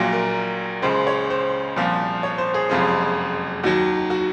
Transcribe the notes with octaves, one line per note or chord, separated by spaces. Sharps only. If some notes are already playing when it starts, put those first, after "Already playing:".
Already playing: A#1 A#2 F#3 F4
A#4
C#2 C#3 G#3 C5
C#5
C5
C2 A#2 F3
C#5
C5
G#4
F#1 F2 C3 F3 G#3
D#2 D#3 F#3 F#4
F#4